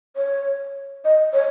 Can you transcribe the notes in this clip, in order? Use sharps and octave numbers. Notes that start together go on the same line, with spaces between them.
C#5
D#5
C#5